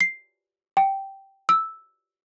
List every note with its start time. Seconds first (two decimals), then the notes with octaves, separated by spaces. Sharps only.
0.01 C7
0.77 G5
1.49 E6